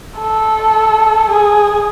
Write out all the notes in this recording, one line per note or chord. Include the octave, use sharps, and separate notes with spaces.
A4
G#4